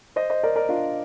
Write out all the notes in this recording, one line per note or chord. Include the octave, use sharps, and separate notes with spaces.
C5 D#5
C5 D#5
A#4 D5
A#4 D5
D4 F4